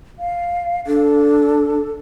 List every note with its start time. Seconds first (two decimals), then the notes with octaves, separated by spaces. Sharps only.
0.19 F5
0.87 D4 A4